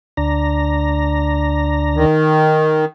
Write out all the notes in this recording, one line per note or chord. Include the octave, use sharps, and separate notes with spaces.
D2 D4 A#5
D#3